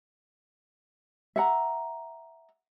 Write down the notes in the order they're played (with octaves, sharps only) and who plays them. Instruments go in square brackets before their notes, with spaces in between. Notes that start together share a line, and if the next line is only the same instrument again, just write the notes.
[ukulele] E5 F#5 A#5